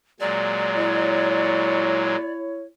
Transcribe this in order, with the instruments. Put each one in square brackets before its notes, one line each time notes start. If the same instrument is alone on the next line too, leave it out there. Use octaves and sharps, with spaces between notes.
[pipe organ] A#2 F#3 G#3 [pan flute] D5
[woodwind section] E4 C#5